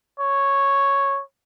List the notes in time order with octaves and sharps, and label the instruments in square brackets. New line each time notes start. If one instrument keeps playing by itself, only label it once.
[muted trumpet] C#5